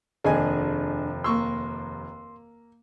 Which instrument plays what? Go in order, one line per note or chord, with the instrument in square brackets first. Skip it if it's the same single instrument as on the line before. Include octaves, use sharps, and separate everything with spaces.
[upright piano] F1 D#2 [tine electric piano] D4 [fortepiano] G#4 D#5 G#5
[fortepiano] A#3 C#6 E6 [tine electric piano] C6